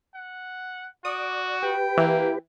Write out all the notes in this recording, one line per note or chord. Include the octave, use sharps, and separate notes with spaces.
F#5
F#4 D5 D#6
G4 B4 G5
E3 A#3